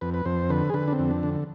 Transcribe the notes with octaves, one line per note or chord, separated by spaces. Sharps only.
F2 B4
B4
F2 C5
D3 B4
G#4
D3 B4
D4
C4
F2
D4
D3